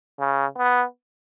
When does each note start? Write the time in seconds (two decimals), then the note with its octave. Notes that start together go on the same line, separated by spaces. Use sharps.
0.20 C#3
0.58 B3